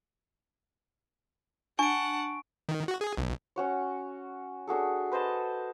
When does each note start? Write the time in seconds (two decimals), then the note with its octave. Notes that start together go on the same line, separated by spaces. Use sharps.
1.79 D4 F#5 G#5 A5 C#6 D7
2.69 D#3
2.88 F#4
3.01 G#4
3.17 B1
3.56 C#4 F#4 C#5
4.67 D4 F#4 G#4 A4
5.12 B4 C5 D#5 A5